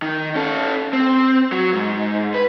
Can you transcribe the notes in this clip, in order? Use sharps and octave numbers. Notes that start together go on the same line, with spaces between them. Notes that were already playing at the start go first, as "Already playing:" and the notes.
D#3
C#4 A4
C4
F#3
G#2
B4